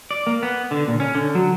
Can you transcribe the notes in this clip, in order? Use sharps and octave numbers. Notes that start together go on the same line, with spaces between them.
D5
A#3
B3
D3
A#2
C#4
D3
F#3